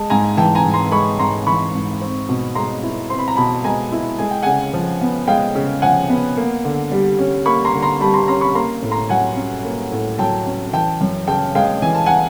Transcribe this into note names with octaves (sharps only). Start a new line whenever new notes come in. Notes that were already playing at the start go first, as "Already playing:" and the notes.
Already playing: G#3 A5
G#2 G#5 A#5
E3 G5 A5
G#5 A#5
G#2
A#5 C6
G#3 B5 C#6
G#2 A#5 C6
E3 B5 C#6
G#2
C4
B2
G#3 A#5 C6
E4
C4 C6
B5
A#5
B2 A5 B5
G#3 G#5 A#5
E4
G#3 G#5
G5
C#3 F#5 G#5
F3
B3
G#3 F5 G5
C#3
F3 F#5 G#5
B3
A#3
D3
G3
C#4
A#3 B5 C#6
A#5 C6
D3
A#5 C6
G3 A5 B5
A#5 C6
C#4 A#5 C6
B5 C#6
A#3 A#5 C6
A2
A#5 C6
F#3 F#5 G#5
C#4
A#3
A2
F#3 G5 A5
C#4
E3 G5 A5
F#2
C#3 G5 A5
G#3 F5 G5
E3 G#5
A5
F#5 G#5